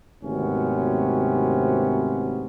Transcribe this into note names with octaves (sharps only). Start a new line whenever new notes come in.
G#1 D2 C3 B3 C#4